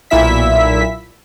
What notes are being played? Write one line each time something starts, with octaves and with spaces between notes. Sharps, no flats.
B1 A#2 E4 E5 B6